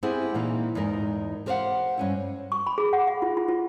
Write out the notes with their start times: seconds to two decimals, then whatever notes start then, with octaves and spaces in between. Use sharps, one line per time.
0.03 B3 C4 E4 G4 G#4 C5
0.34 A#2 E3 A#3 D#4
0.75 E2 G#2 D#4 A#4
1.46 G4 A#4 C5 D#5 F5 F#5
1.97 G2 C#4 E4
2.52 C#6
2.67 B5
2.78 G#4
2.93 F#5
3.07 F5
3.22 F4
3.37 F4
3.48 F4